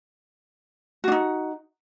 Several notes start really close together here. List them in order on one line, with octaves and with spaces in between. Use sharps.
F#4 D4 D#4